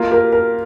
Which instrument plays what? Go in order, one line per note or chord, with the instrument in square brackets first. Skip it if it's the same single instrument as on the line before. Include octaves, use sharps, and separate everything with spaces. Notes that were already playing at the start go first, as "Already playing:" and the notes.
Already playing: [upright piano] A#3 [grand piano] F4
[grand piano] G4 [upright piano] A#4
[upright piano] A#4